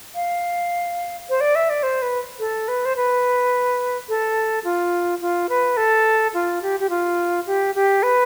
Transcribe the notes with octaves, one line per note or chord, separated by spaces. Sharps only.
F5
C5
D5
E5
D5
C5
B4
A4
B4
C5
B4
A4
F4
F4
B4
A4
F4
G4
G4
F4
G4
G4
B4